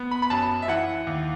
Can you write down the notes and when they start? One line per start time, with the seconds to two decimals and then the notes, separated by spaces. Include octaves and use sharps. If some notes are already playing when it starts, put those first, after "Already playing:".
Already playing: B3
0.11 B5
0.22 B5
0.30 F#2 A5
0.62 E5
0.68 E3 F#5
1.07 D#2